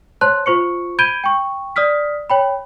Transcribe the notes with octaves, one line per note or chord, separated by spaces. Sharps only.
C5 C#5 A5 C6 F#6
F4 C5 C#6 C#7
B5 G6 G#6 D7 D#7 G7
G5 C#6
D5 D#6 F6 B6
C#5 G5 B5